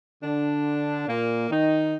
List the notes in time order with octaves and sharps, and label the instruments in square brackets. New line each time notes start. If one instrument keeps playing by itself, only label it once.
[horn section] D3 D4
A#2 A#3
D#3 D#4